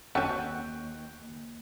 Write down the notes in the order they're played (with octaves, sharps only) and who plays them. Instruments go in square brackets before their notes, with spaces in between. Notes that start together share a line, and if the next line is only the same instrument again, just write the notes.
[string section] D#2 [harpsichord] C#4 A4 [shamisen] F#4 [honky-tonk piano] G5 C#6 F#6